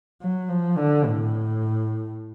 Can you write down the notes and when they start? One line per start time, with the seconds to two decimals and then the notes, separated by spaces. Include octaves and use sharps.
0.21 F#3
0.49 F3
0.77 D3
1.06 A2